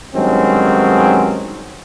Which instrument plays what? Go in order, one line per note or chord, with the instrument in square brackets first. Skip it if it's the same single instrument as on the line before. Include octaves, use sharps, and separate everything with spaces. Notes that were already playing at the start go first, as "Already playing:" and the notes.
[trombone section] G2 D#3 F#3 G#3 C4 C#4